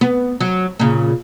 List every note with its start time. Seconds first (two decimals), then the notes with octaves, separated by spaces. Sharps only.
0.01 B3
0.40 F#3
0.79 A#2 C#3